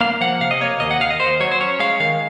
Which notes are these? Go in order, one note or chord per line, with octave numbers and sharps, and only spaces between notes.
A#3 F5
F3 F#5
C3 F5
D#5
A#3 C#5
D#2 D#5
F#5
D#2 F5
D#5
D#2 C5
F#3 C#5
C5
C#4 C#5
G#3 F5
D#3 F5